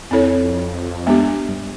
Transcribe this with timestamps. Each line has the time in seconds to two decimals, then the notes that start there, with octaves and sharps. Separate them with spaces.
0.11 F2 C4 E4 A4 C#5
1.07 G#3 B3 D4 G4
1.48 G2